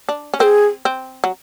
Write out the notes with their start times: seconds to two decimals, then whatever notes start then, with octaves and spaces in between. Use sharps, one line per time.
0.09 D4
0.34 C#4
0.39 C4 G#4 A#4
0.85 C4
1.24 F#3